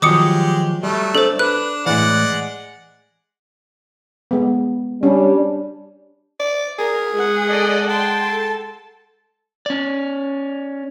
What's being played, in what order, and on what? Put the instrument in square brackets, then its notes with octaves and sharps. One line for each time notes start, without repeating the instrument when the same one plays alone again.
[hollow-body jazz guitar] D#3 F3 F#3 [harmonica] G#3 G4 [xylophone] D6 D#6 C#7
[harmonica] F#3 A3 [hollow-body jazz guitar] G3
[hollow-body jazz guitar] D4 [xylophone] A4 C5
[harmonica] D4 [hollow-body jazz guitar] B4 [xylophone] F#6
[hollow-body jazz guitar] A2 E3 [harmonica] G#3 D5 F#5
[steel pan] G#3 B3
[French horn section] G3 D4 [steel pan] C#4
[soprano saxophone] D5
[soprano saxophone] G#4 [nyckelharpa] A#4
[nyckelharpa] G#3 F#5
[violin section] A4 D5 D#5
[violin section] G5 C6 [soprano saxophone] A5
[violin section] A4
[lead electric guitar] C#4 D5